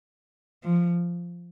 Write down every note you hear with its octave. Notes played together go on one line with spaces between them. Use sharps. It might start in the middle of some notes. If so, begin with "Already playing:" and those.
F3